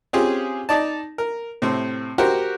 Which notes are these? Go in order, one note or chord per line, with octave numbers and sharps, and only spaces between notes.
C4 C#4 F4 G4 G#4
D#4 D5 A5
A#4
A2 C3 C4
F#4 G4 A#4 C5